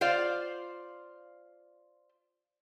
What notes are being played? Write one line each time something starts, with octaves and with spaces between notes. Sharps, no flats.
F4 C5 D5 F5